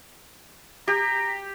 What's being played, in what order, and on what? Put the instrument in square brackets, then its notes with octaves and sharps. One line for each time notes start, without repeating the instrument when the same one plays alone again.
[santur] G4 [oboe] A#5